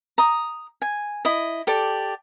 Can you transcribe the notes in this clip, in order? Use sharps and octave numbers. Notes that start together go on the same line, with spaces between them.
A#5 D#6
G#5
E4 D#5
G4 A4 D5